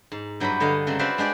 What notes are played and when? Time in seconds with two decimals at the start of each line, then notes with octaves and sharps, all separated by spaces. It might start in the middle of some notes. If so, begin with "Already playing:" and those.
0.12 G#2
0.40 G2 F#3 E4 G4 B4 B5
0.60 D3 C#5 D#5 F5 A#5
0.87 C#3 F#3 G#3 C4
0.99 F#4 B4 C5 D5 E5 F5
1.18 G#3 D4 G4 D5